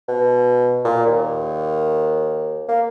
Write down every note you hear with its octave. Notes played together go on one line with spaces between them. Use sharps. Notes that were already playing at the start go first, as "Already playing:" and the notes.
B2
A#2
D#2
A#3